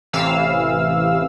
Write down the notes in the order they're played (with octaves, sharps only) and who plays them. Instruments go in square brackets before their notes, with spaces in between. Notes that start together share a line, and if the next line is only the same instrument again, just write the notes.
[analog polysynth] A1 C3 E3 F5 E6